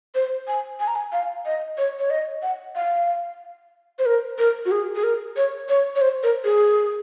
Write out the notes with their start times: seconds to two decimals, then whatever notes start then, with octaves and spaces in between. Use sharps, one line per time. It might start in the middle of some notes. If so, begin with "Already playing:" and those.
0.15 C5
0.48 G#5
0.80 G#5
0.88 A#5
0.95 G#5
1.13 F5
1.46 D#5
1.78 C#5
1.99 C#5
2.10 D#5
2.43 F#5
2.76 F5
3.99 C5
4.06 A#4
4.39 A#4
4.66 F#4
4.71 G#4
4.95 G#4
5.03 A#4
5.37 C#5
5.69 C#5
5.95 C#5
6.01 C5
6.23 A#4
6.44 G#4